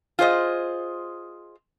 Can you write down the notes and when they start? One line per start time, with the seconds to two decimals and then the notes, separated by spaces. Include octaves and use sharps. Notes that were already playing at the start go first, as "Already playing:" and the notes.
0.19 F4 G#4 C5 D#5